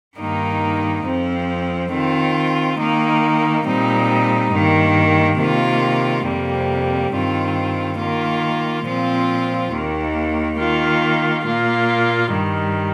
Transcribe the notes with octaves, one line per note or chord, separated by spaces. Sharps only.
G2 D#3 A#3 D#4
F2 F3 C4
D#3 C4 F4
D#3 A#3 D#4
A#2 G3 C4 D#4
G2 D#3 A#3
C3 D#3 A#3 F4
F2 C3 G3 A#3
G2 D#3 C4 F4
D#3 A#3 F4
A#2 F3 C4 F4
D#2 D#3 A#3
D#3 A#3 F4
A#2 A#3 F4
G2 D#3 G3